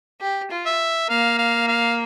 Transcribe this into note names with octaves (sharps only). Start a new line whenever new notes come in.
G4
F4
E5
A#3 F5
F5
F5